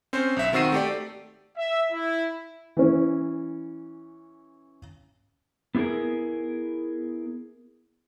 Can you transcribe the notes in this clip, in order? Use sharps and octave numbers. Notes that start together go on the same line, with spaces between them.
C4 C#4 C5
B1 E5
D#3 C4 F#4 E6 C7 D#7
A3 G4 D5
E5
E4
E3 C#4
B3 E4 G4 G#4 A#4